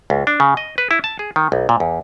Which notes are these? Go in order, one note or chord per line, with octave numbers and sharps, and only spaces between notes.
C#2
D4
C#3
D#5
B4
E4
A5
G#4
D#3
B1
A#2
E2